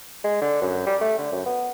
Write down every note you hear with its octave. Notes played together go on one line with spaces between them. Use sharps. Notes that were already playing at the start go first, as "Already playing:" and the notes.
G#3
D3
F#2
G3
A3
D3
F#2
B3